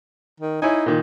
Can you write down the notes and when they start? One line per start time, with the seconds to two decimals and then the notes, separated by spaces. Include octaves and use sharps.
0.40 D#3
0.62 D#4 E4 C#5 G#5
0.86 A#2 D#3